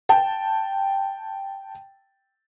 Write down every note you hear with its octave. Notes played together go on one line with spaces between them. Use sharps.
G5 A5